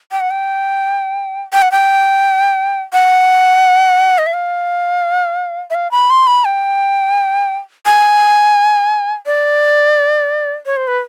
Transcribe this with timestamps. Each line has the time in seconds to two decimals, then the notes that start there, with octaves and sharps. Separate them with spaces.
0.12 G5
0.21 F#5
0.31 G5
1.53 G5
1.62 F#5
1.72 G5
2.93 F#5
4.18 D#5
4.26 E5
4.34 F5
5.70 E5
5.75 F5
5.91 B5
6.10 C6
6.27 B5
6.45 G5
7.86 G#5
9.26 D5
10.66 C#5
10.77 C5
10.88 B4